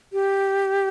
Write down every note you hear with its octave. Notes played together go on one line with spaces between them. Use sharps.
G4